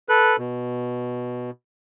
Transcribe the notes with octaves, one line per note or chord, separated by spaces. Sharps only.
A4 B4 F#6
B2